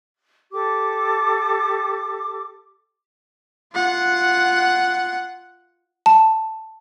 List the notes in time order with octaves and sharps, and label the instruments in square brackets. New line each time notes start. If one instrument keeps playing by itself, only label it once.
[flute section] G4 A4 D6
[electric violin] F4 F#5
[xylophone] A5